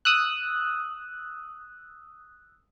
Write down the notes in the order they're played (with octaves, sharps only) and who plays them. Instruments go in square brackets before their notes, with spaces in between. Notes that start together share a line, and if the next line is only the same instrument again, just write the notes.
[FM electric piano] D#6 E6 F#6